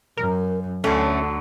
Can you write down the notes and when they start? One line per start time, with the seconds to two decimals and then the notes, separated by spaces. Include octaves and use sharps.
0.17 F#2 A#4
0.84 D2 D3 F#3 A3 C#4